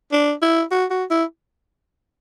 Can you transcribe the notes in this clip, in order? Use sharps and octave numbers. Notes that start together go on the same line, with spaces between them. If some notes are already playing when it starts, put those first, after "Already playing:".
D4
E4
F#4
F#4
E4